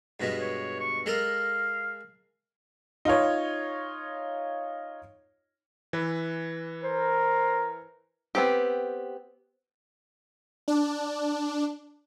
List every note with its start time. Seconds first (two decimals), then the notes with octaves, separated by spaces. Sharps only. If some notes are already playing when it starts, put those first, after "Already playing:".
0.20 G2 B2 G#3
0.41 C#5
0.80 C#6
1.06 G#3 A4 A#4 F5
3.05 D#4 F4 C#5
5.93 E3 B4
6.83 A#4 C5
8.35 B3 C4 G4
10.68 D4